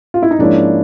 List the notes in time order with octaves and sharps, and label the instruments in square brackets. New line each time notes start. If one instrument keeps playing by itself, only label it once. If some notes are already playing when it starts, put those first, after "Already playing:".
[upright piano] F4
E4
D#4
[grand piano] G#2 F3 A#3 C#4 E4 [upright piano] D4